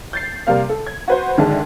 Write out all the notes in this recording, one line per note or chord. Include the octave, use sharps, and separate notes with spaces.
G6 A6 C7
C3 G3 A#3 F5
A4
G#6
F#4 B4 C5
D#2 G#2 D3 G#4 E5 A5